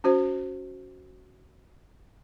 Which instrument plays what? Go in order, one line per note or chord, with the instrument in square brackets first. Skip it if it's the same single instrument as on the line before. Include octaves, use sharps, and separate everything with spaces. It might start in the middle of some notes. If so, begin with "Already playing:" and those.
[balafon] C#4 F#4 C5